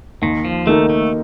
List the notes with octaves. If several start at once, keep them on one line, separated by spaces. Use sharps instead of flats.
D#2 D#3
F3
D#3 A3 A#3 D#4 A4
A3